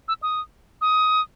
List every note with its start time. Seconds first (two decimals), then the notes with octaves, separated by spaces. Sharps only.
0.08 E6
0.22 D#6
0.81 D#6